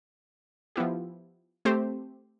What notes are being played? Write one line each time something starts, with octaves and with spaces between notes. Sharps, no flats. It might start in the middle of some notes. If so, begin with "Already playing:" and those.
F3 B3 E4 G4
A3 C4 G4 C5